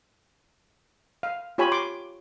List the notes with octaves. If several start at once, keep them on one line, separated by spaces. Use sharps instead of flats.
F5
F4 G4 C#5 G#5 B5
C6 D6